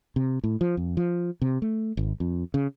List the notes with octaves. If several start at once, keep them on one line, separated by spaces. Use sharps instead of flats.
C3
A2
F3
F2
F3
C3
A3
G#1
F2
C#3